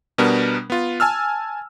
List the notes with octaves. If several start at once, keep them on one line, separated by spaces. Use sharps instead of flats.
B2 G3 B3 D4 A#4
B3 F4
G#5 A5 E6 F6